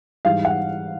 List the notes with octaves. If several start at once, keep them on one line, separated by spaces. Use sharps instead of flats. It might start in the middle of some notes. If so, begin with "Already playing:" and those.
G#2 E3 G3 F5
F#5